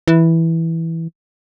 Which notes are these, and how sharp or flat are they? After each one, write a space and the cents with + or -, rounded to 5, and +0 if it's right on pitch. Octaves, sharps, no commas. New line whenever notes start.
E3 -5